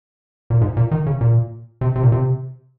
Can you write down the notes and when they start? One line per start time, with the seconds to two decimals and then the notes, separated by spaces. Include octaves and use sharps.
0.50 A#2
0.61 G#2
0.77 A#2
0.91 D#3
1.06 C#3
1.21 A#2
1.81 C3
1.96 C3
2.03 A#2
2.12 C3